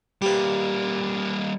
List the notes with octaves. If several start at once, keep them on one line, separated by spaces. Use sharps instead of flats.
G3 A#3 G4 B4